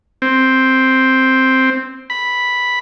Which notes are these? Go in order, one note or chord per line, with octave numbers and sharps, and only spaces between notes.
C4
B5